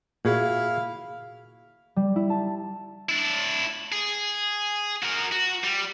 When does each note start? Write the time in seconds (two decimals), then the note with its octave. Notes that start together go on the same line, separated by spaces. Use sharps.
0.25 A#2 E4 F#4 G#4 F5
1.96 G3
2.16 E4
2.30 A5
3.09 D4 E4
3.92 G#4
5.02 F#4 A#4
5.32 F#4
5.64 G3